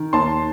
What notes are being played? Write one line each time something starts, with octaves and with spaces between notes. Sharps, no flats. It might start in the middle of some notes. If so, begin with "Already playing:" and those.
Already playing: D#3
D#2 A5 C6